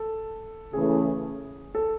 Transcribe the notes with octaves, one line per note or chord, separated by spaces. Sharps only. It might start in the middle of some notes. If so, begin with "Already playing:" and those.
Already playing: A4
C#3 E3 A3 G#4
A4